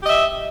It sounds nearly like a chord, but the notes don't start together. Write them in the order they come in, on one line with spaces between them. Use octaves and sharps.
G4 D#5 E5